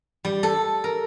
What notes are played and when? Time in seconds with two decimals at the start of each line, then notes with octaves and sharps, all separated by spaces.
0.25 G3
0.43 A4
0.84 A#4